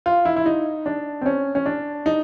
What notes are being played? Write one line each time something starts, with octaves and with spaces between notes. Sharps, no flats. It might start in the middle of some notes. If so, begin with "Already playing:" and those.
F4
E4
E4
D#4
D4
C4
C#4
C#4
D4
D#4